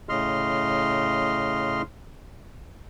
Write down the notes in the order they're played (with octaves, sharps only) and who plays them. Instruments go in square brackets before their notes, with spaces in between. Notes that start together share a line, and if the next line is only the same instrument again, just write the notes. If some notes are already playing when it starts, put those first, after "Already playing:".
[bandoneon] A2 C#3 D#5 C6 F6